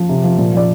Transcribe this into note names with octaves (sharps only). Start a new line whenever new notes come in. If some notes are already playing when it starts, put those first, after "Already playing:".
Already playing: F3
C3
F3
A#2
F3 D5